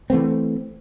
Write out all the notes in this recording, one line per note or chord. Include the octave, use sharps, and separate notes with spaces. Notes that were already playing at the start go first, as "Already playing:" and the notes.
E3 A3 B3 C4